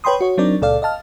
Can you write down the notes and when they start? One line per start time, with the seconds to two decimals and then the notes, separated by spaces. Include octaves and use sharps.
0.04 B4 C#5 G5 B5 C6 D#6
0.21 F#4 C#5
0.37 F#3 C4 D4 D#4 A#4 D5
0.61 C#2 A#2 A4 D5 F5
0.82 D#5 F5 A5 F6